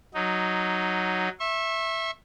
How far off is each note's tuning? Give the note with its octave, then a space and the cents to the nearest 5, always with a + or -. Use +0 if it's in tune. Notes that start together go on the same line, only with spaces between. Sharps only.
F#3 +0 D#4 +0
E5 +0 C#6 -40